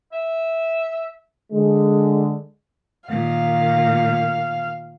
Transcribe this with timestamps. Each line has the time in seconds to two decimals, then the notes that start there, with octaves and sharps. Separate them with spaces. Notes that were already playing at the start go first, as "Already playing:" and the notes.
0.13 E5
1.52 D3 G#3
3.09 A#2 D#3 F5